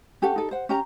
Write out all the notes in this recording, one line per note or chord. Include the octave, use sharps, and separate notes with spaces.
C#4 G4 A4 F#5
D#4 A4
C5 F#5
C#4 G4 A#5